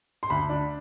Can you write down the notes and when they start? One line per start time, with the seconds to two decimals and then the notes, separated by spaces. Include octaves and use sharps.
0.23 C6
0.30 D2 B5
0.49 D4